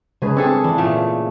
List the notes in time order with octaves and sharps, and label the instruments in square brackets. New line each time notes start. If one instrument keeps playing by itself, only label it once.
[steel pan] C#3 G#3 B4 [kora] G#4
[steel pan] C4 D4 [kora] G#4 A4 C#5
[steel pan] E3 [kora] D4
[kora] A#2 C#3 A3